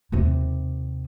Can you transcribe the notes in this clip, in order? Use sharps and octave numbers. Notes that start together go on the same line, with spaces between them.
D#2 C3